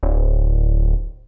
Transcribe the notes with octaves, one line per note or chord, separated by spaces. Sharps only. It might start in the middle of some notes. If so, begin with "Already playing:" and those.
D1